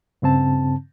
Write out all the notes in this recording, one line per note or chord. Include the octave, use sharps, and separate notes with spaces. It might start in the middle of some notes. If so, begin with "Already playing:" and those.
G2 C#3 C4 A5